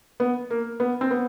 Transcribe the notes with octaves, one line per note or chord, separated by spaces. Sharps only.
B3
A#3
B3
C4
B3